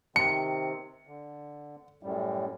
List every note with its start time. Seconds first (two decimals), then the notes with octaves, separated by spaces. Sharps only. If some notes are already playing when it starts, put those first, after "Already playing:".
0.16 C3 D#3 C4 C#7
1.07 D3
2.03 F#2 A2 G3